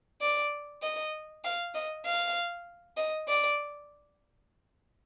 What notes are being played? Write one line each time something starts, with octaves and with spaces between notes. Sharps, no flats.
D5
D#5
F5
D#5
F5
D#5
D5